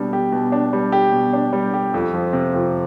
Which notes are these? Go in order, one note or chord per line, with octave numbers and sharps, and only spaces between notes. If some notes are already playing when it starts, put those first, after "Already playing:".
Already playing: B2 G3 D4
G4
B2
D4
G3
G4
B2
D4
G3
G4
F2
F3
C3
F2